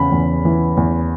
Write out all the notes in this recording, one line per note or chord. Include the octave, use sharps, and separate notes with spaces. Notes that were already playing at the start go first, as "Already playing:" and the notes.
Already playing: E2 C#3 B5
E2
E3
E2